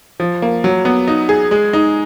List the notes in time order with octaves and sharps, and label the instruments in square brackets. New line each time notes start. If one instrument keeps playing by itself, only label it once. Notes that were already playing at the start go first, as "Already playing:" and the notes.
[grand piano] F3
A#3
F#3
B3
D#4
G#4
G#3
D#4